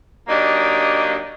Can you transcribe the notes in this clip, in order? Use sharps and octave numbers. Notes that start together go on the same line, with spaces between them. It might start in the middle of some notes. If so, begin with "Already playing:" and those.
F#3 A#3 D4 D#4 G4 D#5